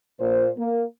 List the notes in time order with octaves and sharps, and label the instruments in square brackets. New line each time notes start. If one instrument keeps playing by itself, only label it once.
[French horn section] A#2 C5
A#3